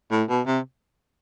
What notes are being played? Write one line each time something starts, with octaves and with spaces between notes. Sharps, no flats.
A2
B2
C3